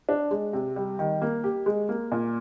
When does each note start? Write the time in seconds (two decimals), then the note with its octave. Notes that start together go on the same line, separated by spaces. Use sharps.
0.09 D4
0.31 G#3
0.53 C3
0.76 G3
0.99 D#3
1.22 A#3
1.44 G4
1.66 G#3
1.89 A#3
2.12 A#2